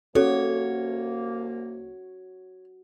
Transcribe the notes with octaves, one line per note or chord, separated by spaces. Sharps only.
C2 A#3 C#4 F#4 A4 C#5